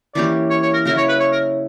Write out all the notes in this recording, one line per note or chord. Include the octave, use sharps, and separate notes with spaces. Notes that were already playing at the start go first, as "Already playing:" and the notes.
E3 A#3 C#4 G4 D5
C#5
C#5
A#4
C#3 F#3 C#4 E4 A#4
C#5
B4
C#5
A#4